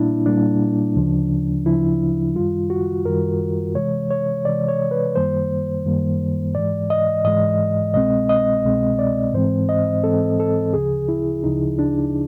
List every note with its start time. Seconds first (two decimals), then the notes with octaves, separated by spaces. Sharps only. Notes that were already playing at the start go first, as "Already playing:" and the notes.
Already playing: A#2 G3 A#3 D4 E4
0.26 A#2 G3 A#3 D4
0.95 D2 C#3 F3
1.66 D2 C#3 F3 E4
2.35 F#2 D#3 G3 F4
2.70 F#4
3.05 F#2 D#3 G3 A#4
3.75 C3 E3 G#3 C#5
4.11 C#5
4.45 C3 E3 G#3 D5
4.69 C#5
4.91 B4
5.16 F#2 D#3 G3 A#3 C5
5.85 F#2 D#3 G3 A#3
6.55 G#2 E3 G#3 D5
6.90 D#5
7.24 G#2 E3 G#3 D#5
7.94 C2 B2 G#3 C4 D#5
8.29 D#5
8.64 C2 B2 G#3 C4
8.99 D5
9.34 G#2 E3 G#3 C4 C5
9.69 D#5
10.04 G#2 E3 G#3 C4 A4
10.40 A4
10.73 D2 C#3 F3 G#4
11.08 E4
11.44 D2 C#3 F3 D#4
11.79 D4